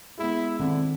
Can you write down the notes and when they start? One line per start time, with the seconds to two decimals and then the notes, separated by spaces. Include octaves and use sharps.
0.19 G#3 B3 E4
0.60 D3 D#3 C4